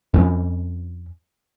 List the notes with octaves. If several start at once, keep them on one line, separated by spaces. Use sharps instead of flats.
F2 C4 C#4